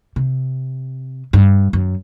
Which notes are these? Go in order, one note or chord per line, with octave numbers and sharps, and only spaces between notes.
C3
G2
F#2